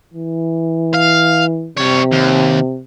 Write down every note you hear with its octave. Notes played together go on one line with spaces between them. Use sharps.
E3
F5
C3 G3 C#5
D#2